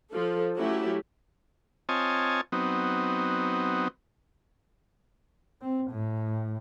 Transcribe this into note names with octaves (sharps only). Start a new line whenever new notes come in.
F3 A4
F#3 A3 C#4 E4 G4
C4 F4 C#5 D#5 G#5 A5
F#3 B3 C4 D#4
C4
A2